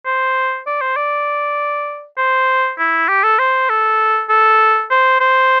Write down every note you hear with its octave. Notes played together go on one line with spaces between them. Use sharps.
C5
D5
C5
D5
C5
E4
G4
A4
C5
A4
A4
C5
C5